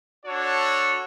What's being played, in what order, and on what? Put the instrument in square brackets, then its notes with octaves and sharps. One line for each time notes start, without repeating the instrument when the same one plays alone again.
[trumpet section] D4 F#4 A4 C#5